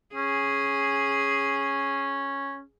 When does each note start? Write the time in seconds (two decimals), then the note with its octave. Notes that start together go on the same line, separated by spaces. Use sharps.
0.15 C#4 G#4